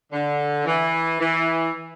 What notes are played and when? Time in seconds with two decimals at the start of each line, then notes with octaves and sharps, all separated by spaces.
0.12 D3
0.66 E3
1.20 E3